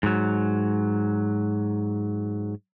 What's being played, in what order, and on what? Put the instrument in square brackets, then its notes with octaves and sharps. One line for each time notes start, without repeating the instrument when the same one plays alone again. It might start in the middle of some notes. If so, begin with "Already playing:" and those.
[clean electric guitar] G#2 F#3